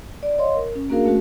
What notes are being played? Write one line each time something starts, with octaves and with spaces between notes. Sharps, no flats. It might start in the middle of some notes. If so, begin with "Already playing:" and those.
D5
C#5 D#5 F5 C6
A#4
C#4
A#3 D4 F#4 G#4 A#4 F5
A3 C#4 F#4